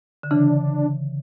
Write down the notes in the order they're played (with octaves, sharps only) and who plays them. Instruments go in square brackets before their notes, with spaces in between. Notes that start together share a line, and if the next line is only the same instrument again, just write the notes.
[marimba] D3
[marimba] C#3 E3 [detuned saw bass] D4